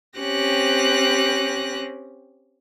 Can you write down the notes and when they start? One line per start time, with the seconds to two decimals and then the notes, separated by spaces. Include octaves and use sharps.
0.19 C4 C#4 G4 F#6 A#6